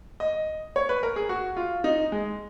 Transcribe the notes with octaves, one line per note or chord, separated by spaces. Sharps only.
D#5
C#5
B4
A#4
G#4
F#4
F4
D#4
G#3